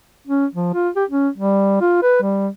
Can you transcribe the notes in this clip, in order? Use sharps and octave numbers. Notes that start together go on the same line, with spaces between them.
C#4
F3
F4
G4
C#4
G3
F4
B4
G3